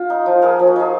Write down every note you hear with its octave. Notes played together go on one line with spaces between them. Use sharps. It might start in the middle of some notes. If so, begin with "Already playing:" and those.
Already playing: F4
D#4
F3
A#3 G#4
F3
F#4
D#4 G#4